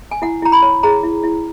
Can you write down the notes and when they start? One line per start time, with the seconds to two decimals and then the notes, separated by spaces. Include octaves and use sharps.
0.11 G#5
0.22 E4 F#5
0.42 E4 A#5
0.52 B5
0.62 C#5
0.83 G#4 A#5
1.03 E4
1.23 E4